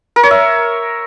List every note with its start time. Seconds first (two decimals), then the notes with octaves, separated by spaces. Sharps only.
0.16 A#4
0.23 C#5
0.31 E5